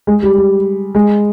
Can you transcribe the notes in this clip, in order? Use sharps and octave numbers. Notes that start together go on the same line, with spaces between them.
G#3
G3
G3
G#3